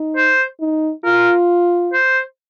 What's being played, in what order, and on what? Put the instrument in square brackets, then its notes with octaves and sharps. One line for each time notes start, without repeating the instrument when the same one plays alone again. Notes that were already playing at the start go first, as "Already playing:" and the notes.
Already playing: [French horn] D#4
[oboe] C5
[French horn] D#4
[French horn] F4 [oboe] A#4
[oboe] C5